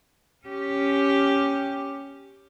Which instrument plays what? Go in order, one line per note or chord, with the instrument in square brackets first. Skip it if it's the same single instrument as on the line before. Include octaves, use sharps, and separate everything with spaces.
[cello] C#4 G4